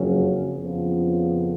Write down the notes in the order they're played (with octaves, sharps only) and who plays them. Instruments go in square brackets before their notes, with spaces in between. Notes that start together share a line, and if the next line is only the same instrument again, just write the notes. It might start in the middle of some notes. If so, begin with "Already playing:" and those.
Already playing: [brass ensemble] F#1 F2 C#3 F#3 C#4
F2 C#3 F3 B3